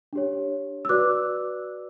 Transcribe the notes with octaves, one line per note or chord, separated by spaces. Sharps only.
D4 G4 C#5
E6
F#4 B4 D5 D6 F#6